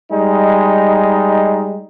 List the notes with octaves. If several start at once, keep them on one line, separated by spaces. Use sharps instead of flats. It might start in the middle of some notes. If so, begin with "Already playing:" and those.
G3 G#3 D#4